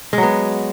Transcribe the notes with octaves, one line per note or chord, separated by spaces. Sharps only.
F#3 G#3 B3